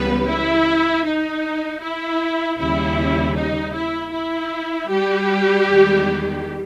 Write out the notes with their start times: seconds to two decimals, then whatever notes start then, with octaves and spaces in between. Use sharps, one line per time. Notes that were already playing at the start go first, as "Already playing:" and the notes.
Already playing: C#2 C#3 E3 G3 B3 B4
0.27 E4
1.05 D#4
1.81 E4
2.58 D#2 C#3 G3 E4
3.36 D#4
3.74 E4
4.13 E4
4.89 G3 G4
5.67 E2 D#3 G#3